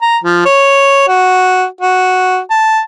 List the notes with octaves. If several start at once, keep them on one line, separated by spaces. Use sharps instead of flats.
A#5
F3
C#5
F#4
F#4
A5